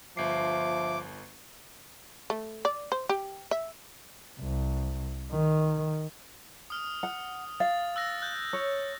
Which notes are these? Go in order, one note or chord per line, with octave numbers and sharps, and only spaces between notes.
G1 F3 E5 D6 C7
A3
D5
C5
G4
E5
C2
D#3
D#6 F6
F#5
F5 A6
E6 F#6 A#6
F#6 G6
C#5